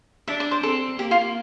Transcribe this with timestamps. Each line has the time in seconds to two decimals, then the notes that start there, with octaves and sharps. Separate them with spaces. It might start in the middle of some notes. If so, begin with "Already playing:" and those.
0.28 D4 E5
0.40 D5
0.51 C5
0.63 C4 A4
0.99 A#3 G4
1.11 F4